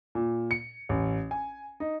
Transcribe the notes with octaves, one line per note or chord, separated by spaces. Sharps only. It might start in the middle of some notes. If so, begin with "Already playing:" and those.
A#2
C#7
A1
G#5
D#4